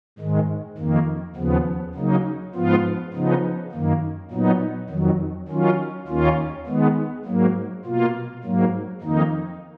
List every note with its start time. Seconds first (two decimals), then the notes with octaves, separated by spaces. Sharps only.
0.19 G#2 D#3 G#3
0.78 F2 D#3 A#3
1.36 D#2 C#3 F3 B3
1.95 C#3 F#3 A#3 D#4
2.55 G#2 F3 B3 F4
3.14 C#3 F3 B3 D#4
3.72 F#2 D#3 A#3
4.31 A#2 F#3 B3 D#4
4.90 F2 D#3 F#3
5.48 D#3 F#3 C#4 F4
6.08 D#2 D#3 A#3 C#4 F4
6.67 D#3 G#3 B3
7.25 G#2 F#3 A#3
7.85 B2 A#3 F4
8.44 G#2 F#3 A#3
9.02 F2 D#3 A#3 D#4